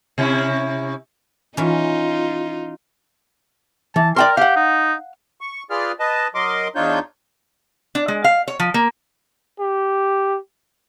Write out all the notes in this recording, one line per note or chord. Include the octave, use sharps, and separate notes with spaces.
C3 C#4 E4
E3 C#4 D#4 F4
E3 A5
A#4 D5 G5 C6
G4 F5 F#5
D#4
C#6
F4 G#4 B4 D5 F6
B4 D#5 A5
F#3 A#4 D#5 C6 D6
E2 D4 D#4 F4 C#5 G6
D4
G#3
F5
C#5
F3
A#3
G4